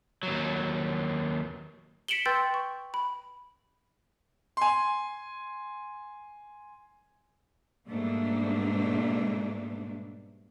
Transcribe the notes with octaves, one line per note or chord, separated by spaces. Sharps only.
D#2 F#3
B6 C#7 D7 E7 F#7 G7
B4 G5 C6 E6 G6 A6
C#6
B5
G#5 C6
G#2 B2 G3 A3 A#3 D4